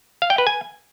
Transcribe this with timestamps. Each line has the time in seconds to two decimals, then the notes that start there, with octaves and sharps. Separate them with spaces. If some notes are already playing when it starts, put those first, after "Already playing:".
0.22 F5
0.30 G5
0.38 B4
0.47 G#5